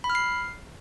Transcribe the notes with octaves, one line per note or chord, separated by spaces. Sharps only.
B5
F6
C7